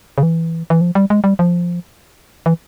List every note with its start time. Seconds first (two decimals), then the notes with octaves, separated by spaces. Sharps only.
0.18 C#3
0.23 E3
0.70 E3
0.81 F3
0.95 G3
1.10 G#3
1.24 G3
1.39 F3
2.46 E3